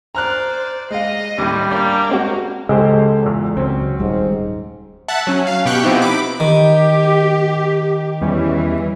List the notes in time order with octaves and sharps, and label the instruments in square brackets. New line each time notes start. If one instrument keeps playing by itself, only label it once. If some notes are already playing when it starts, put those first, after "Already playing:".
[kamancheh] C5 D5 [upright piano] A#5 F6 F#6
[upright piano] G#3 F5 [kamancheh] D#5
[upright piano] D#2 A2 [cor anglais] G3
[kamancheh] A#3 D4 [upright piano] D5 G6
[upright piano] G#3 C4 F#4
[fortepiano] C#2 G4 C5 [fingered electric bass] C#3 [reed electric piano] G#3 [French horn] A4
[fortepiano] E2 A#2
[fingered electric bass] C#2 [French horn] F#3 [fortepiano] C4 C#4
[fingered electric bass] D#1 G3 [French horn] G#2
[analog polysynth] E5 F#5 A5 F#6
F#3 C#4
F5
B2 G4 G5 C#6 F#6
F3 B3 C4 D#4 E4 G4
B5 D6
[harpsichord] D#3 [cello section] G4
[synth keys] E2 G3 C#4 [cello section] E3